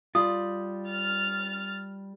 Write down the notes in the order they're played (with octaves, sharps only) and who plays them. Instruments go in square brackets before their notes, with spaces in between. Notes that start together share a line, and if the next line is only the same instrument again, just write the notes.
[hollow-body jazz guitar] G3 F4 [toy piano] D#6
[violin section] F6 A6